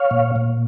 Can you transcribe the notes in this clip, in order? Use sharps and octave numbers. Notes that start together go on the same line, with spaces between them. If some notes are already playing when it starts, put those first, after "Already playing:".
Already playing: C#5 F5
A#2
A#2